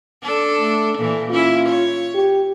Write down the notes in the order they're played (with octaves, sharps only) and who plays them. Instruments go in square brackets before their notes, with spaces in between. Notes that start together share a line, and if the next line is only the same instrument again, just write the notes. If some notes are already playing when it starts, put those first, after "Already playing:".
[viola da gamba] D4 A4
[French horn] A3
[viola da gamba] A#2 E3 [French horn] A4
[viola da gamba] C#4 E4 [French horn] F4
[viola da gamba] C#5
[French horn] G4